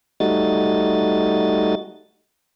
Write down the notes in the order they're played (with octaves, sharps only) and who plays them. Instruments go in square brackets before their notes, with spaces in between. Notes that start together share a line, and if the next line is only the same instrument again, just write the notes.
[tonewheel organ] G3 A3 D#4 F#4 D#5 A6